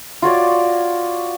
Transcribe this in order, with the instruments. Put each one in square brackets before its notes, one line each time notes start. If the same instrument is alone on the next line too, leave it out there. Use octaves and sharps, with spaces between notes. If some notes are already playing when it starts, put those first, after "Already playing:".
[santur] F4 F#4 C#5 D5